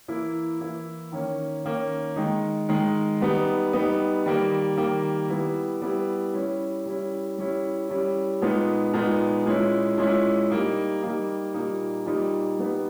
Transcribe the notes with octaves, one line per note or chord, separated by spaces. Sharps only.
E3 A#3 E4
E3 A#3 E4
D#3 A#3 C#4
D#3 A#3 C#4
D#3 G#3 D#4
D#3 G#3 D#4
G3 B3 D#4
G3 B3 D#4
D#3 G3 A#3
D#3 G3 A#3
G3 B3 E4
G3 B3 E4
G3 C#4 E4
G3 C#4 E4
G3 C#4 E4
G3 C#4 E4
A#2 G#3 B3 D#4
A#2 G#3 B3 D#4
A#2 G#3 C#4 E4
A#2 G#3 C#4 E4
G3 A#3 D#4
G3 A#3 D#4
A#2 G3 A#3 D#4
A#2 G3 A#3 D#4
G3 B3 D#4